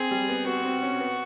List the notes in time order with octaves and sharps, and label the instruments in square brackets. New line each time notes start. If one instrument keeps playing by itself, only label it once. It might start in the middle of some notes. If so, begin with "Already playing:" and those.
Already playing: [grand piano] C4 [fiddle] G#4
[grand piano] G3
B3
[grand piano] B3 [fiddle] F#4
[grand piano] C4
C#4
B3